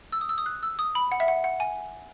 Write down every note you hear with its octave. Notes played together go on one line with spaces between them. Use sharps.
E6
D#6
E6
D#6
F#6
E6
D#6
B5
F#5
E5
F#5
F#5
G#5